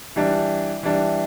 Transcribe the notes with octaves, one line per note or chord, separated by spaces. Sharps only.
E3 G3 D4
E3 G3 D4